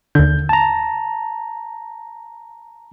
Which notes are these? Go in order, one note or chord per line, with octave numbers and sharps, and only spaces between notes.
D#2 D3 G6
A5 A#5